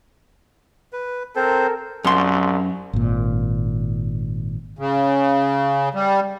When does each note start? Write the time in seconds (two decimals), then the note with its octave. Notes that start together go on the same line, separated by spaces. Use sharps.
0.93 B4
1.36 C4 A4 A#4 C5
2.04 C2 F#2 C6
2.93 G#1 A#2
4.79 C#3
5.95 G3